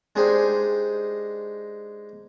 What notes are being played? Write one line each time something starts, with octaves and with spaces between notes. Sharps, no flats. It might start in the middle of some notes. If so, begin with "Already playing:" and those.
G#3 D4 D#4 G4 G#4 C5